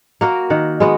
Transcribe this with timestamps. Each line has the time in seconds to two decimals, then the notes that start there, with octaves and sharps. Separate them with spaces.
0.21 A#3 F#4 A#4
0.50 D#3 F#5
0.80 G#3 B3 F#4